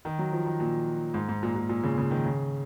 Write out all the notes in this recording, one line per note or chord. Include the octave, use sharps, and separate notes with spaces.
D#3
F#3
F3
D#3
A#2
G#2
G#2
A#2
A#2
A#2
C#3
C#3
D#3
C#3